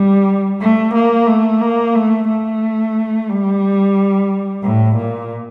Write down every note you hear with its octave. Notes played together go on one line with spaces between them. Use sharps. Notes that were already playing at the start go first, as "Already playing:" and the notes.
Already playing: G3
A3
A#3
A3
A#3
A3
A3
G3
A2
A#2